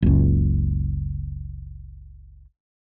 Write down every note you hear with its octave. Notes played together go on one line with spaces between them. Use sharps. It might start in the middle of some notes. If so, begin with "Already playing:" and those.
F#1 C#2